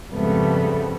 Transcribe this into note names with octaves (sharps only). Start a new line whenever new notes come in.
F2 G#2 C#3 G3 A3 B3